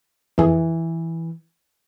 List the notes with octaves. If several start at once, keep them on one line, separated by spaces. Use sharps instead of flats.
F2 E3 G#4